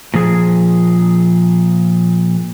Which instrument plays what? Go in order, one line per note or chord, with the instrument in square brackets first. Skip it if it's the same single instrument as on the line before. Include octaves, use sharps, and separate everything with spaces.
[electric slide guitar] A#2 F3 G#4